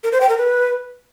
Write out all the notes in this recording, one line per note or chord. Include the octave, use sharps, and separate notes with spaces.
A#4
C5
G5
A#4
B4